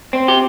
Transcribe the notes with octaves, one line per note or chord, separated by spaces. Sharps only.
C4
G4